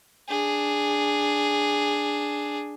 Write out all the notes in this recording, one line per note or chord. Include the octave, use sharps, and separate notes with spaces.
D4 G#4